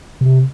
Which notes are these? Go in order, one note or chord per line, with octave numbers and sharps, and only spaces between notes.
C3